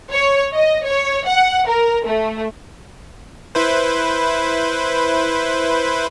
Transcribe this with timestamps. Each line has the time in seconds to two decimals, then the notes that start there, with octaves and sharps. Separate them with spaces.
0.12 C#5
0.54 D#5
0.86 C#5
1.27 F#5
1.67 A#4
2.06 A3
3.55 E4 B4 C5